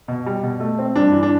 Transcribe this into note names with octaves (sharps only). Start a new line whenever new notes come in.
B2
G3
B2
A3
C4
G2 D4
E3
D4